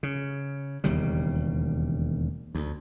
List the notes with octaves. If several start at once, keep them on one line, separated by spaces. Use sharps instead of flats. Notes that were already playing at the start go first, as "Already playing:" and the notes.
C#3
E1 D#2 C#3 G3
D2